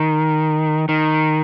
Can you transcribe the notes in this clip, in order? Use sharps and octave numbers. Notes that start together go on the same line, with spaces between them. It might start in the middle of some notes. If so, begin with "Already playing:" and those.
Already playing: D#3
D#3